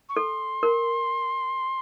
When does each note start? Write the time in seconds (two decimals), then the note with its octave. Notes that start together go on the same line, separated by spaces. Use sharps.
0.09 C#6
0.16 A4 C6
0.63 A#4